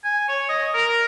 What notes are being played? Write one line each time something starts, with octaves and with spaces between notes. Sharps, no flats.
G#5
C#5
D#5
A#4